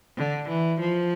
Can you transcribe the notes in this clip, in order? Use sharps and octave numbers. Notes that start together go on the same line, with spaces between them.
D3
E3
F3